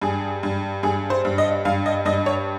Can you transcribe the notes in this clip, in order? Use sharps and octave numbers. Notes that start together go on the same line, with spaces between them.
G2 G#4
G2
G2 G#4
C5
G2
D#5
G2 F5
D#5
G2 D#5
C#5